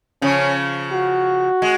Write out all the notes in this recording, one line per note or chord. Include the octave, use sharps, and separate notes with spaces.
C#3 F3 C#4
F#4
G#3